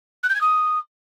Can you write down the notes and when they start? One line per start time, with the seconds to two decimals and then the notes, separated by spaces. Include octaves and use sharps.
0.23 F#6
0.29 G6
0.35 G#6
0.41 D#6